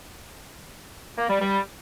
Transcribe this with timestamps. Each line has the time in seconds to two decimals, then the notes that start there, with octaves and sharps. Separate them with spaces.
1.18 A#3
1.30 G3
1.41 G3